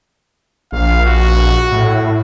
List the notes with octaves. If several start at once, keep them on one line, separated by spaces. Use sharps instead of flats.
A#1 F5
F#4
A2